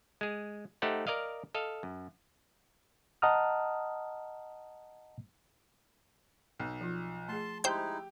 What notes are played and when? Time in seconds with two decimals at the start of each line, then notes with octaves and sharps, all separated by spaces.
0.21 G#3 G#4
0.82 A3 D#4 G4 C5 F#5
1.07 A#4 D5 D#5 F5
1.55 A4 D#5 F5
1.83 F#2
3.22 D#5 F#5 A5 A#5 D#6 F6
6.60 B1
6.81 F3 F4
7.29 A3 G#4 A5 C6
7.64 G#3 D#4 E4 G4 C5 G6